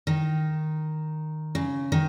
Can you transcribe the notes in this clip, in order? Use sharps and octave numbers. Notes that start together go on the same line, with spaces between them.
D#3
C#3
D#3